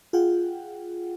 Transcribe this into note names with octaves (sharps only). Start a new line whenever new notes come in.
F4 G#4 F#5 G5